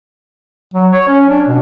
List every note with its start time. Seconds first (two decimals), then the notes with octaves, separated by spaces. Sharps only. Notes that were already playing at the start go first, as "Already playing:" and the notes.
0.74 F#3
0.92 C#5
1.08 C#4
1.29 D4
1.48 B2